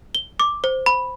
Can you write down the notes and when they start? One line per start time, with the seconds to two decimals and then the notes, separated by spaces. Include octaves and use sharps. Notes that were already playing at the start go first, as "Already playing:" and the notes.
0.15 G7
0.40 D6
0.64 C5
0.86 B5